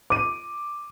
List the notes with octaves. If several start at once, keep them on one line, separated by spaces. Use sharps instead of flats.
D6 D#7